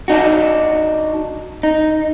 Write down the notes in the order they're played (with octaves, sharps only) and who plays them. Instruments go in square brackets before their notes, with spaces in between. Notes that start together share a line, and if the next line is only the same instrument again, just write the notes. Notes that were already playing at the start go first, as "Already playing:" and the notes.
[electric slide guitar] D4 D#4 F#4
D#4